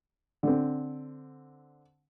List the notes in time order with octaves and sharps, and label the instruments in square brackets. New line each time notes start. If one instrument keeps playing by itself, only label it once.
[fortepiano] D3 C4